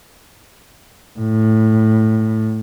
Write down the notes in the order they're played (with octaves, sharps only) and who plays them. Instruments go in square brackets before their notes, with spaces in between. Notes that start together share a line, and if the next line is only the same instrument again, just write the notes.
[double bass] A2